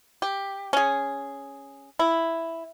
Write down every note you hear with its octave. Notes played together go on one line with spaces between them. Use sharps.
G4
C#4 G#4
E4